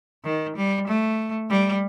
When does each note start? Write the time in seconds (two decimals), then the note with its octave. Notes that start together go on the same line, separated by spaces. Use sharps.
0.24 D#3
0.56 G3
0.88 A3
1.50 G3